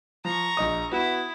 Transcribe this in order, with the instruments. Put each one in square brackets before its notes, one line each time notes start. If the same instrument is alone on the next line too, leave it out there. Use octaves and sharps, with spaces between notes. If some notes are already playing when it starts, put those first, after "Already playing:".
[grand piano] F3 [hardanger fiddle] A#5 C#6
[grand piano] A#1 D#5 D#6
[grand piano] B3 F#4 [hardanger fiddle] E4